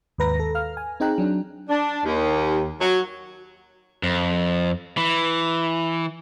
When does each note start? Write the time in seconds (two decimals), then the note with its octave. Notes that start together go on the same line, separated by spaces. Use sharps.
0.18 D#2 G#2 B4 A#5 A#6
0.39 A4
0.55 F5 F6
0.77 G#5
1.00 C4 D#4 G#4 G5 A#5 F#6
1.18 F#3 D4
1.69 D4
2.05 D#2
2.80 F#3
4.03 F2
4.98 E3